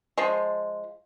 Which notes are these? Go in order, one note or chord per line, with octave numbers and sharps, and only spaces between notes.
F3 G#3